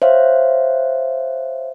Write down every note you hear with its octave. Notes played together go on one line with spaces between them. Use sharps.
C5 C#5 E5 F5